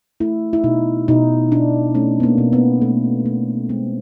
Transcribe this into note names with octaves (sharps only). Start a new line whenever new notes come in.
A3 E4
E4
B2 D#4
B2 D#4
B2 D4
A3 C#4
B3
A#3
B2
B3
A3
A3
G#3 C4